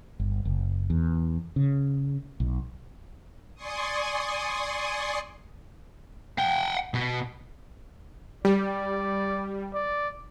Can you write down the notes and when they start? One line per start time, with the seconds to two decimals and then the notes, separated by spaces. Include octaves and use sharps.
0.20 G1
0.45 F#1
0.90 E2
1.56 C#3
2.40 B1
3.55 D5 G#5 C6 C#6 D#6
6.39 F#5 G5
6.94 B2
8.45 G3 D5
9.74 D5